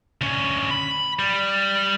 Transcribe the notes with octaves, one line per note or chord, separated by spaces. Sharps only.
D2 C#4
B5
G3